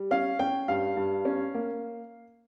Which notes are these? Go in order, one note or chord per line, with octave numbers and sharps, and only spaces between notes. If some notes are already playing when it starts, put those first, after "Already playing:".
Already playing: G3
C#4 F5
C#4 G5
G2 F5
G2
C#4
A#3